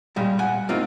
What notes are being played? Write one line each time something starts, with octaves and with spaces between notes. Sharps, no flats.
A#2 G3 G#3
F#5 G#5
A3 A#3 C4 D#4 F4